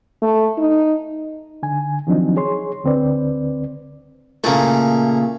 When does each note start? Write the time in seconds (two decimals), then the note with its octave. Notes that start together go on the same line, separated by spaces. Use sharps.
0.22 A3
0.58 D#4
1.63 D3 G#5
2.07 D#3 F3 F#3 C4 D4 D#4
2.37 G#4 C#5 C6
2.84 D2 D3 C4 B4 D5
4.44 A#2 C#3 A3 A#3